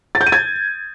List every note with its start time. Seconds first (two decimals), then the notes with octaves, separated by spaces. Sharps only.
0.15 A6
0.21 G6
0.27 D#7
0.32 G#6